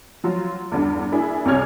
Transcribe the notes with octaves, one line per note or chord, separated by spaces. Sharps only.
F3 F#3 F4
E2 G2 D3
A#3 D4 E4 G#4
C2 C3 G#4 C#5 F6 G#6